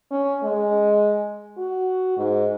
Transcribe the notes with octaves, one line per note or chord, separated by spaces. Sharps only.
C#4
G#3
F#4
G#2